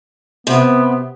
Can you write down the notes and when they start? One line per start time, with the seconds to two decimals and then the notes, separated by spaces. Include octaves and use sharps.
0.47 C3 B3